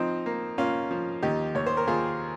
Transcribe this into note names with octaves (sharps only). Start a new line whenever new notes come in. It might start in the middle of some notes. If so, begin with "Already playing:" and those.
Already playing: F3 C4 D#4
A#3
A#3 C#4 F4
F3
D#2 D#4 G4
D#2 C#5
C5
A#4
D#2 F4 G#4